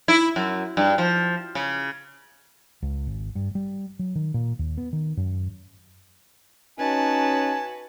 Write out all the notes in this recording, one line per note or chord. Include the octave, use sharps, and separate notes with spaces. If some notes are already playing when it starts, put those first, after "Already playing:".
E4
F#2
G2
F3
C#3
C#2
G#1
G2
G3
F#3
D#3
A#2
D#2
B3
D#3
F#2
C#4 D#4 F#4 B4 G#5 A5